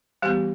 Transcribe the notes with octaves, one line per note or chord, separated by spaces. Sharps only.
E3 G3 B3 G4